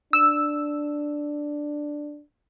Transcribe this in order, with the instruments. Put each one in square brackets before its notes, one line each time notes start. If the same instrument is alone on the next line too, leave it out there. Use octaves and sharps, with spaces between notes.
[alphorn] D4 [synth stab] E6